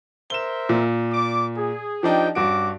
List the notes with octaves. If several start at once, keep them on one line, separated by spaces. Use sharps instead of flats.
A#4 C5 E5 E7 G7
A#2
D5 D6
G#4
F3 D4 D#4 G4 G5
G2 C#4 F#4 D6 D7